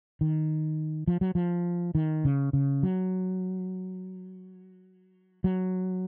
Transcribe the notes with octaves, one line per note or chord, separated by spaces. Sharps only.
D#3
F3
F#3
F3
D#3
C#3
C#3
F#3
F#3